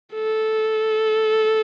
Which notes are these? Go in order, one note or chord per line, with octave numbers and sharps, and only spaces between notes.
A4